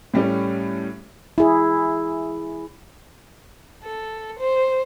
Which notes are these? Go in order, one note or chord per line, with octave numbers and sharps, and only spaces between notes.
A2 G3 A3 C#4
E4 G#4
A4
C5